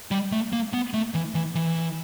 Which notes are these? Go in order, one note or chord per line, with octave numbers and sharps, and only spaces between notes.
G3
A3
A#3
B3
A3
E3
E3
E3